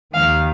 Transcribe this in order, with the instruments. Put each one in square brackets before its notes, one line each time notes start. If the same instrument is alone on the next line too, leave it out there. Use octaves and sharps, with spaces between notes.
[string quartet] D#2 D#3 F5